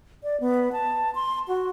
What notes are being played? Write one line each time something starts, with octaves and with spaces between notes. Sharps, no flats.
D5
B3
A5
C6
F#4